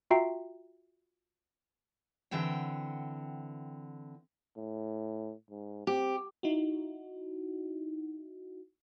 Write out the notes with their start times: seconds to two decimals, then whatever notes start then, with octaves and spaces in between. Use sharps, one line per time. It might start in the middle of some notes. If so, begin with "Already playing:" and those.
0.10 F4 F#4 E5 G5 A#5 C7
2.31 D3 E3 C4 F#5 G5
4.57 A2
5.51 G#2
5.87 C4 G4
6.43 D#4 E4 F#4